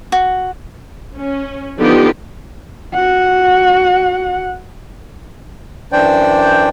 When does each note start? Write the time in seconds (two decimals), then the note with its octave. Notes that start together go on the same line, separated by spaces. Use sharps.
0.12 F#4
1.15 C#4
1.78 D3 F3 B3 D#4 F4 G4
2.94 F#4 F#5
5.92 F#2 E3 D4 C5 D5 G5